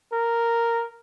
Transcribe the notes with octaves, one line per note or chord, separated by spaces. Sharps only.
A#4